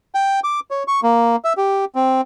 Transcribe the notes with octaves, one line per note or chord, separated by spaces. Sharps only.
G5
D6
C#5
C#6
A#3
E5
G4
C4